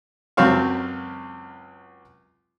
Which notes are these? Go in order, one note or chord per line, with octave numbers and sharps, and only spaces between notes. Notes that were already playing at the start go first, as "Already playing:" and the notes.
C#2 F#2 F#3 C4 F5 C#6